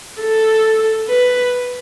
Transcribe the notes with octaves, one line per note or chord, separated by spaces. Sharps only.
A4
B4